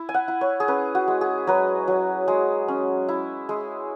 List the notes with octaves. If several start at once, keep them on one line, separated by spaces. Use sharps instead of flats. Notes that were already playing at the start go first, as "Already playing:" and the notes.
Already playing: E4
G#5
F#5
E4
C#5
G#4
C#4 B4
F#4
G#3
G#4
F#3 B4
F#3
G#3
C#4
E4
G#3